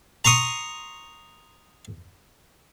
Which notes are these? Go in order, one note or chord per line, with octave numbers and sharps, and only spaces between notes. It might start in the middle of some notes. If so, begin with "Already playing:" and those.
A#5 C6 C#6 D#6